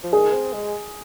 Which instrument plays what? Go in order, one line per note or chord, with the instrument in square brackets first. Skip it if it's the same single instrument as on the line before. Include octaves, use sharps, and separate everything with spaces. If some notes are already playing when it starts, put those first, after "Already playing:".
[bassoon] F3
[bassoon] D#3 [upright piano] G#4
[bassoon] C4
G#3